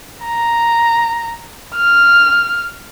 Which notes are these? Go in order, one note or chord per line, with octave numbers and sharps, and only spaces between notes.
A#5
F6